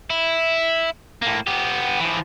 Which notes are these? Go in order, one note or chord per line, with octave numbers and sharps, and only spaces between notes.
E4
A2 A#3
B3 G4
E3 F3